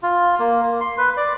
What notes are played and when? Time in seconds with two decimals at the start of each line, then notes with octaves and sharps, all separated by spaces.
0.03 F4
0.39 A#3
0.62 A#3
0.81 C6
0.98 B4
1.17 D5